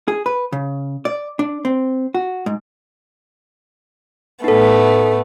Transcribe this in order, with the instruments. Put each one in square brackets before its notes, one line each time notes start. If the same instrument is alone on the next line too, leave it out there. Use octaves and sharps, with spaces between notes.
[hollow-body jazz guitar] G#4
B4
C#3
D5
D4
C4
F#4
G#2
[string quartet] A2 A3 B3 [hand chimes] D#4 A4